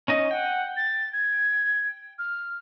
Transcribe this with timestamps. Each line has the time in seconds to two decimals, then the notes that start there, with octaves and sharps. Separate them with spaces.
0.08 C#4 D#4 D#5
0.31 F#5 G5
0.77 A6
1.13 G#6
2.19 F6